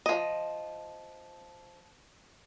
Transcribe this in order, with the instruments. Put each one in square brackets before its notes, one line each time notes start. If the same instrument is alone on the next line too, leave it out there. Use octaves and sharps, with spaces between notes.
[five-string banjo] F3 D#5